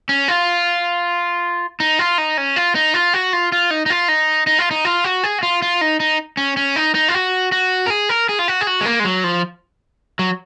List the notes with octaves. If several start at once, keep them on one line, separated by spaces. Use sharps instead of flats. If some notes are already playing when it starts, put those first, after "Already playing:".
C#4
F4
D#4
F4
D#4
C#4
F4
D#4
F4
F#4
F4
F4
D#4
D#4
F4
D#4
D#4
F4
D#4
F4
F#4
G#4
F#4
F4
F4
D#4
D#4
C#4
C#4
D#4
D#4
F4
F#4
F#4
A#4
G#4
A#4
G#4
F4
F#4
G#4
F#4
G#3
A#3
G#3
F#3
F3
F#3